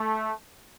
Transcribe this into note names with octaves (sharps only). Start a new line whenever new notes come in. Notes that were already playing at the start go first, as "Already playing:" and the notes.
Already playing: A3